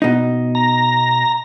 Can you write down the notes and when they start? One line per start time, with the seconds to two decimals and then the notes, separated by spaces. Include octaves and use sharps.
0.02 B2 D#4
0.55 A#5